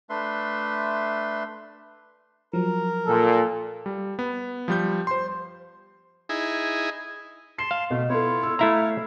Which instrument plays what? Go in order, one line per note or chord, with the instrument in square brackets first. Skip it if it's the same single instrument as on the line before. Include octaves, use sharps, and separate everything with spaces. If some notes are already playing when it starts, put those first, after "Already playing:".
[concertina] A3 D4 B4 E5 C6
[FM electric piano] F3 F#3 [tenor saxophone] A#4
[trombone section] A#2 [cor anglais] A4
[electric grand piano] G3
B3
F3 G3 G6
C5 C6
[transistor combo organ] D#4 E4 G#4
[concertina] A5 C6 [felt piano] C7
[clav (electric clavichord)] F5
[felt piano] B2 [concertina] A3
[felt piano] B3 A4 [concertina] E4 F4 C#5
[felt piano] E6
[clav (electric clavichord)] A3 E4 A#5 [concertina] C#5 F5 [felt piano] E5 E6